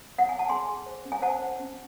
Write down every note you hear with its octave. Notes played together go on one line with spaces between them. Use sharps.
F#5
G#5
A5
G#4 G#5 C6
G#4
C5
C#4
G#5
C5 F#5 A5
C5
C#4